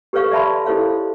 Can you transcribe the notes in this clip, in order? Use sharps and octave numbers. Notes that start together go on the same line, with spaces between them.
G4 A4 B4 C#5 F5 C#6
D5 E5 A5 B5 C6
E4 G4 A4 C5 C#5 F5